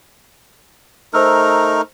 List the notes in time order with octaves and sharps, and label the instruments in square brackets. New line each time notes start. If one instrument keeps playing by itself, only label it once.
[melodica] A3 D#4 A#4 [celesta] C5 E6 F6